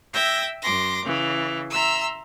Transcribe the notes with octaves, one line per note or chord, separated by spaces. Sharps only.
E5 G5 E6 G6 G#6 A#6
F#2 C6 D6 A#6
C#3 E3
E5 A#5 C6 E6